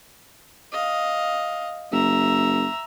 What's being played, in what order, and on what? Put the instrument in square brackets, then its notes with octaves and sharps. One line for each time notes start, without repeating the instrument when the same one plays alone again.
[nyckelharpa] D#5 F5
[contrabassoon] F#1 [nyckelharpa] E5 A#5